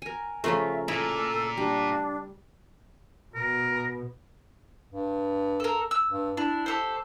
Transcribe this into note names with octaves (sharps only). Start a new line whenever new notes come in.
A#4 G#5
C#3 F3 A3 C#4 F4 A#4 E5
A#2 E4 A4
G3 D4
B2 A#4
G2
A4 A#4
E6
G2
D4 E4
G4 A4 C5